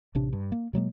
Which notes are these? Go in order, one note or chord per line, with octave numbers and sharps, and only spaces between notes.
A1 C3 D4
G2
A#3
B2 F#3 G#3 A#3